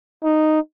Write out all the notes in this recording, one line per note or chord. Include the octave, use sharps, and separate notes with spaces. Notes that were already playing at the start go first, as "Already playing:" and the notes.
D#4